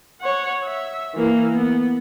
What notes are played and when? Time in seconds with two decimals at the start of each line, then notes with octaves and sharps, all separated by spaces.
0.21 C#5 F#5
0.64 E5
1.15 E3 A#3
1.54 B3